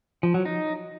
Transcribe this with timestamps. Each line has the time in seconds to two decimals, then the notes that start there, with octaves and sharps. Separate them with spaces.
0.23 F3
0.34 F#3
0.45 D#4